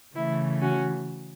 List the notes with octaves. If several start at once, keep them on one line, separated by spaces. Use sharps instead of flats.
C#3 E3 A3 E4
C#4 F#4